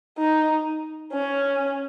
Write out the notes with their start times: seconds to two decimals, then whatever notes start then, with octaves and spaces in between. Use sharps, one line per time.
0.18 D#4
1.12 C#4